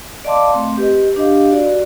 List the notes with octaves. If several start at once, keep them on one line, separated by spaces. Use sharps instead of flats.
D5 D#5 F5 A5 C6 D6
A3 C4 C6
G4 B4 D#5
D4 G4 D#5 F5
F#4 D5